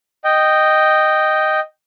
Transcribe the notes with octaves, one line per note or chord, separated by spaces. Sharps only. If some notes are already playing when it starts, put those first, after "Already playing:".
D#5 G5